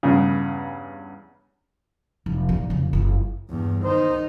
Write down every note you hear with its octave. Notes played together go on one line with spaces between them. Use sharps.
E2 G2 C#3
F1
D#2 A#2
F1 C#3
F#1 F4
E2 G2
D#3 D#4 C5